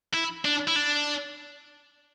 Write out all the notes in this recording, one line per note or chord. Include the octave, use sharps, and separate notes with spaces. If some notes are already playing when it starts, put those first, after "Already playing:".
E4
D4
E4
D4